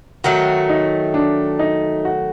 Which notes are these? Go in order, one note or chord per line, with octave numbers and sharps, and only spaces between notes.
D#3 F#3 A3 F#4
D#4
D4
D#4
F#4